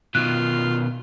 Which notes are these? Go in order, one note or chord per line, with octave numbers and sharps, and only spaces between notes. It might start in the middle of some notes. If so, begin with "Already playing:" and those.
B2 D#3 F4 F#6